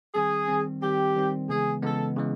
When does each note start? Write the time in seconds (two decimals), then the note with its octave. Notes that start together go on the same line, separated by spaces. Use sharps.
0.14 D#3 G3 C4 G#4
0.48 D#3 G3 C4
0.82 D#3 G3 C4 G4
1.16 D#3 G3 C4
1.49 C#3 E3 G#3 B3 G#4
1.82 C#3 E3 G#3 B3 A4
2.16 C#3 E3 G#3